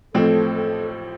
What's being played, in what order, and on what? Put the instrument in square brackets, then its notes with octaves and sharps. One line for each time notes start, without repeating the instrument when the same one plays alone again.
[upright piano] A1 A2 F3 C4 [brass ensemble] A4
[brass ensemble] A4